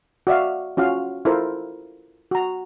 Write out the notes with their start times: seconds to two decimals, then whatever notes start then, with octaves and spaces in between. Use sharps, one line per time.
0.27 F#4 D5 E5 F5
0.77 C#4 F4 F#4 F5
1.25 E4 F4 A4 A#4 C5
2.31 F#4 A#5